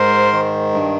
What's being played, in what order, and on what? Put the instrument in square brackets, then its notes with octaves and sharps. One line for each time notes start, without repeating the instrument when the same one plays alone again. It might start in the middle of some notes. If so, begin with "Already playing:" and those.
Already playing: [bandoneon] G#2 A#4 C5
D#3
G2